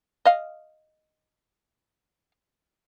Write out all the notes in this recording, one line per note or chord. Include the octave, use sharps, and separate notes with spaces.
D#5 F5